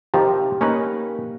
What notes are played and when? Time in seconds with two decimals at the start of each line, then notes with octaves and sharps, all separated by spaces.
0.14 C3 D#3 F3 G4
0.61 A#3 C#4 D#4 B4